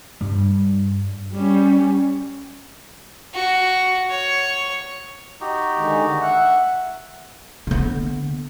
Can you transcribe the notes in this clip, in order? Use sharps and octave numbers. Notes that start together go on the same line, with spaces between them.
G2 G3
G3 C#4
F#4
C#5
D#4 F#4 G4
D3 D#3 G#3
E5 F#5
D3 B3